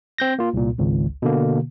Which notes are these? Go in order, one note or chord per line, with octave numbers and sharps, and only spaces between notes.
C4 G6 A#6
A#3 F4
C2 A#2
G#1 C#2
B2 D3 A#3